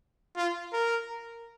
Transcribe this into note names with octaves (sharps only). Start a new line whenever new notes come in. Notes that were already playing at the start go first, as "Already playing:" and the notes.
F4
A#4